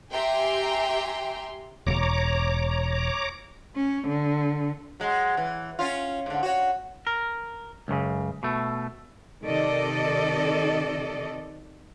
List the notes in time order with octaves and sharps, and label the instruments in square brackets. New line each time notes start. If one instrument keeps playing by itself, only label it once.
[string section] G4 E5 G5 G#5 A#5 C6
[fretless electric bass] E1 [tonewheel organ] C#5 A#5 D6
[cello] C#4
D3
[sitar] F#3 G#3
E3
C#4 F4
G#2 D3
F#4 C#5
[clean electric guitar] A#4
C#2 F#2 A2 C#3
B2 A3
[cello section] C3 D#3 A4 D5 D#5